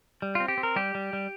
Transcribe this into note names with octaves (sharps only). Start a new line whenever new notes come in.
G3
C4 F4
G4
C4
A#4
G3 G4
G3
G3